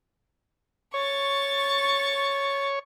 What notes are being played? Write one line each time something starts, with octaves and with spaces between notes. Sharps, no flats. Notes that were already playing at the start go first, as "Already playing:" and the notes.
C#5 C#6 A6